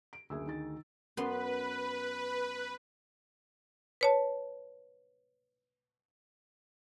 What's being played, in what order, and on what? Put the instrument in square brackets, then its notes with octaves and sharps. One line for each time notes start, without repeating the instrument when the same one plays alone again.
[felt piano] D7
[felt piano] F#1 E5 E6 [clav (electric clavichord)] D2 G#4 G#5
[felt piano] D#3 D#4 A6
[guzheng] F#2 B3 C6 [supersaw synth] B4
[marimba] B4 C#5 A5